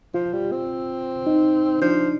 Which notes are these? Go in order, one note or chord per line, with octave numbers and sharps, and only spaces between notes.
F3 F4
G3
C4
D#4
F3 D4